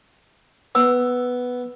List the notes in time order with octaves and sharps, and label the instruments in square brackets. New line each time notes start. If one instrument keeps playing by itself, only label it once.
[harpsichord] B3 [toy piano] E6